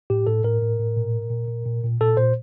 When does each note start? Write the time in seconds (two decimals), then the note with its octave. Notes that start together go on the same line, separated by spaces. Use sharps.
0.10 A2 G4
0.27 A2 A4
0.44 A2 A#4
0.62 A2
0.79 A2
0.97 A#2
1.14 A#2
1.30 A#2
1.48 A#2
1.66 A#2
1.84 A#2
2.01 A#2 A4
2.17 A#2 C5